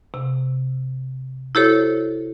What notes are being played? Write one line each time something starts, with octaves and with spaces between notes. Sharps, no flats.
C3
E4 F#4 G4 A4 C5 C#5